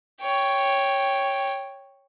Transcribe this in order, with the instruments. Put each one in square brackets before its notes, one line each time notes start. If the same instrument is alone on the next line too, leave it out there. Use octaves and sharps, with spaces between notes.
[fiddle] C#5 G5